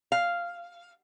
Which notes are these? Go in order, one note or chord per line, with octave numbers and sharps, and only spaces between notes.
F5